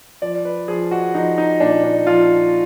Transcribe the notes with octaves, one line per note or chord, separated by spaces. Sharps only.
F3 D5
B4
F3 G#4
F#4
F3 D#4
D#4
A#2 D4
D4
F3 F4